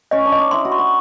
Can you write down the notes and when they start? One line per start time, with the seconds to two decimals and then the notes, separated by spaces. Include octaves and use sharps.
0.11 C#4 D#5
0.26 D4
0.32 D#5
0.39 D#4
0.51 E4 C6
0.65 F#4
0.72 C6
0.79 F#4